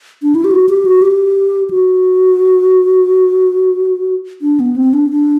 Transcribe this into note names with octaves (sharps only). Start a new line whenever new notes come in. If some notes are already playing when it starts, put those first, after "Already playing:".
D4
E4
G4
F#4
G4
F#4
G4
F#4
D4
B3
C4
D4
D4